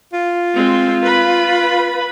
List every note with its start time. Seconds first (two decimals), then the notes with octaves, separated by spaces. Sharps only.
0.13 F4
0.54 G#3 C4
1.03 B4 B5